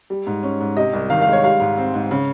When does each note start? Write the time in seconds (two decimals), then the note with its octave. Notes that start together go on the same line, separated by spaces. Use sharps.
0.10 G3
0.27 G#2
0.43 C#4
0.60 G#2
0.77 C3 D#5
0.93 C2
1.10 D#3 F5
1.22 F5
1.27 G#3
1.33 C#5
1.44 G3 F5
1.60 G#2
1.77 C4
1.94 G#2
2.11 C#3